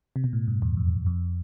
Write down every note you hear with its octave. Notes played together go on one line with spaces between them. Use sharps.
C3
B2
A2
G2
E2
F2
F2